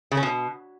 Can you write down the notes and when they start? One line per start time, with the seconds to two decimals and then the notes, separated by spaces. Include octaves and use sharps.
0.11 C#3
0.17 C#4
0.23 B2